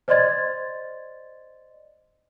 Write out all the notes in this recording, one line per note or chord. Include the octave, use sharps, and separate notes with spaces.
C5 D5 D#5 C6 G#6 A6